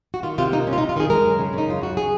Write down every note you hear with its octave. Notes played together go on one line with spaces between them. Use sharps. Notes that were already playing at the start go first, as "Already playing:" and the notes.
F#4
D#3 F4
C3 F4
A#3 D#4
C3 C#4
F4
D#4
C3
F4
D#3 G#4
G#3 A#4
F#2
C#3
C#3 D#4
F#2 F4
F#2 F#4
G#4